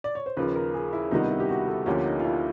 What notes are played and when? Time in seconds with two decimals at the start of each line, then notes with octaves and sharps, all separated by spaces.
0.04 D5
0.15 C#5
0.26 C5
0.37 D#2 C#3 F3 B4
0.56 A#4
0.74 G#4
0.93 E4
1.11 C#2 C3 D#3 G3 B3 D#4
1.30 E4
1.40 G4
1.49 F#4
1.68 A4
1.86 D2 D3 F3 A#3 C#4 G4
2.06 D#4
2.20 F4
2.24 E4